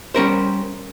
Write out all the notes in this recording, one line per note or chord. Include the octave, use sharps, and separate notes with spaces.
G3 C#4 A#4 C5